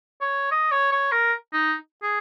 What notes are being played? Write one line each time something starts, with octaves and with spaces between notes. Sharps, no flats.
C#5
D#5
C#5
C#5
A#4
D#4
G#4